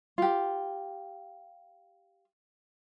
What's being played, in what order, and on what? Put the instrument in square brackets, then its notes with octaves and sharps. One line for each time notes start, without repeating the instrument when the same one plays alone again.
[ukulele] F4 G4